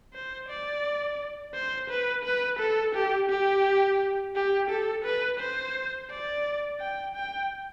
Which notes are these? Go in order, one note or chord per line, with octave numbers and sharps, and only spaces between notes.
C5
D5
C5
B4
B4
A4
G4
G4
G4
A4
B4
C5
D5
G5
G5